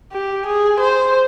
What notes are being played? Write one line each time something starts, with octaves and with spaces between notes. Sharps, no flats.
G4
G#4
C5